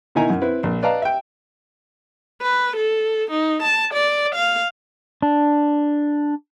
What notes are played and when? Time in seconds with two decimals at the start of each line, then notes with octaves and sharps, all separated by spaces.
0.15 B2 D#3 D#4 E4 G#5 A#5
0.30 F#2
0.42 C4 E4 B4
0.63 A#1
0.83 B4 D5 D#5 F5 A5 A#5
1.02 E5 G5
2.42 B4
2.76 A4
3.31 D#4
3.62 A5
3.94 D5
4.35 F5
5.22 D4